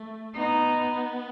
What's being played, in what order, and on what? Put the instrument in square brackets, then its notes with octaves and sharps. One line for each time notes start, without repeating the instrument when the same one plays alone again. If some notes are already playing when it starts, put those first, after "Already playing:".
Already playing: [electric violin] A3
[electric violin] B3 [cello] D#4